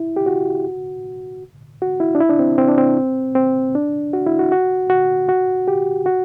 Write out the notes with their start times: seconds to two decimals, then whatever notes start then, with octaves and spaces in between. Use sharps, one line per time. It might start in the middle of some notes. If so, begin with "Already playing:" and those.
Already playing: E4
0.16 G4
0.26 F#4
1.82 F#4
2.00 E4
2.15 D4
2.20 E4
2.30 D4
2.39 C4
2.58 C4
2.68 D4
2.78 C4
3.35 C4
3.75 D4
4.13 F#4
4.27 E4
4.39 F#4
4.52 F#4
4.90 F#4
5.29 F#4
5.68 G4
6.06 F#4